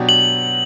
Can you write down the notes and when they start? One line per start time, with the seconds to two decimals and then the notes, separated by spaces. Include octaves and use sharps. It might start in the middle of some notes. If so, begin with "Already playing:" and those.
Already playing: B2 F#3 B3 D4 G4
0.09 F#7